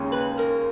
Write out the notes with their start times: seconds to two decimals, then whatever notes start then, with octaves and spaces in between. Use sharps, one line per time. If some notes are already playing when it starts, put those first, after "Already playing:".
Already playing: D#2 C#3 G#3 C#4
0.12 B4
0.38 A#4